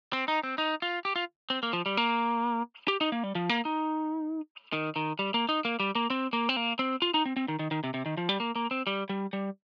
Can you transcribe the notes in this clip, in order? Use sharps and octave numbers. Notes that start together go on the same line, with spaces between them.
C4
D#4
C4
D#4
F4
G4
F4
C4
A#3
F3
G3
A#3
G4
D#4
A#3
G3
F3
A#3
D#4
D#3
D#3
G3
A#3
D#4
A#3
G3
A#3
C4
A#3
C4
A#3
C4
F4
D#4
C4
C4
D#3
D#3
D#3
C3
C3
D#3
F3
G3
A#3
A#3
C4
G3
G3
G3